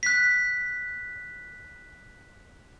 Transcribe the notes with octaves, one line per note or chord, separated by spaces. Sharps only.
F#6 B6